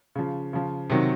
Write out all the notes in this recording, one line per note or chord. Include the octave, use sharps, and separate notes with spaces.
C#3 F3
C#3 F3
C3 D#3 F#3